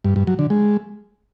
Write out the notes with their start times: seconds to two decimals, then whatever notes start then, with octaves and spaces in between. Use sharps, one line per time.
0.04 G2
0.16 G2
0.27 F#3
0.39 D3
0.50 G#3